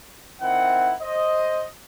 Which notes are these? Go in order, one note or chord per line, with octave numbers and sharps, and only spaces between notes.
D#3 C4 E4 F#5
C5 D#5